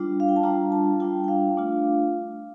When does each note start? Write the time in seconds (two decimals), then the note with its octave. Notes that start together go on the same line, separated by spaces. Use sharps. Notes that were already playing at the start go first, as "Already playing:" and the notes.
Already playing: G3 D4 F4
0.20 F5
0.28 G5
0.36 A5
0.43 G3 D4 F4 A#5
0.72 A5
1.00 G3 D4 F4 G5
1.24 G5
1.28 F5
1.57 A3 D4 F4